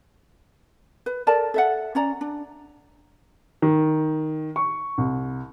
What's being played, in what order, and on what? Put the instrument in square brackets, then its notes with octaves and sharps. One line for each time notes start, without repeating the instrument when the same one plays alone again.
[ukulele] B4
A4 A#4 D5 A5
A4 E5 F#5
C#4 D5 A#5
D4
[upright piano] D#3
C#6
C2